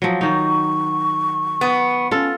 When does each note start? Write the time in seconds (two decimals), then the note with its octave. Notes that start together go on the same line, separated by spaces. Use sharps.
0.02 F3 F#3
0.21 D#3 D#4 C#6
1.61 B3
2.11 C#4 F4 A4